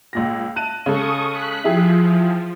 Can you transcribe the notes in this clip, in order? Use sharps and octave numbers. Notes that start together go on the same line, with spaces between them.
C#2 A#2 A#6
A5 F#6 D#7
C#3 G#3 A4 C#6 D#6
F#6 B6
F3 E4 G4 G#4